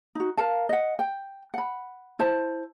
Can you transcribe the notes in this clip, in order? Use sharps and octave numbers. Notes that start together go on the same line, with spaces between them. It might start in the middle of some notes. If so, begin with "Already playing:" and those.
D#4 F#4
A#4 F5 A5
D#5 F#5
G5
F#5 B5
E4 C5 A5